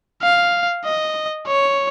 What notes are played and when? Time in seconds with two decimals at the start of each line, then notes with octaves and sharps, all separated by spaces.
0.22 F5
0.85 D#5
1.47 C#5